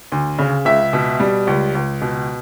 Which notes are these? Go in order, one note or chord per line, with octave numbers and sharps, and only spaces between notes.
D2
C#3
C#2 E5
B2
G3
C#2
C#2
B2